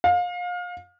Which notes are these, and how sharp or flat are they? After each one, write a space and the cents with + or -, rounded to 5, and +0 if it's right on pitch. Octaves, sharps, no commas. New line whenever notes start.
F5 +30